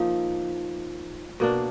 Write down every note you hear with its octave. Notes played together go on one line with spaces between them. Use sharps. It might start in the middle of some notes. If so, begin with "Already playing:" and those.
Already playing: F3 A#3 D#4
B2 A#3 D4